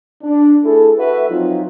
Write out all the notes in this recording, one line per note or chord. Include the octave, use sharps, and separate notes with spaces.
D4
A3 E4 G#4 A4
F#4 B4 E5
F3 F#3 C4 D#4 F4